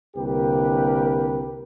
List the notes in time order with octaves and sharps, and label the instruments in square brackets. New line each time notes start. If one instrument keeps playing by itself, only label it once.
[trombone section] C2 D3 A#3 G4 A#4 B4